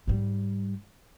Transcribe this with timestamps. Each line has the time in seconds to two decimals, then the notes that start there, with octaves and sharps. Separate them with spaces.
0.07 G#2 G3